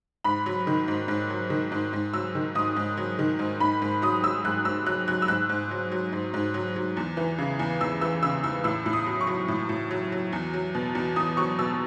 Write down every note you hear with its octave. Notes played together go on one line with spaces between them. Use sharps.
G#2 B5
F#3
D#3
G#2
G#2
F#3
D#3
G#2
G#2
F#3 E6
D#3
G#2 D#6
G#2
F#3
D#3
G#2
G#2 B5
G#2
F#3 D#6
F#3 E6
G#2 F#6
G#2 E6
F#3 F#6
F#3 F#6
E6
G#2 F#6
G#2
F#3
F#3
G#2
G#2
F#3
F#3
E2
E3
C#3
E2
E2 E6
E3 E6
C#3 E6
E2 E6
A2 E6
A2
D#6
F#3
C#6
F#3
A2
A2
F#3
F#3
E2
F#3
B2
E2
E2 D#6
F#3 C#6
B2 E6